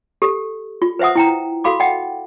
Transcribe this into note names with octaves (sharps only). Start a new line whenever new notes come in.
G4 A4
F4
B4 C5 E5 F#5 D#6
E4 G5 A#5
F#4 A4 F5 B5 D6
D#5 F#5 G5